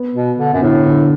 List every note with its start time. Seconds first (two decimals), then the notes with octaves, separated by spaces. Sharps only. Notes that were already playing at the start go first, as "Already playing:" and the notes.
Already playing: B3
0.15 B2
0.38 D3
0.54 F#2 B2
0.62 A2 D3
0.85 D3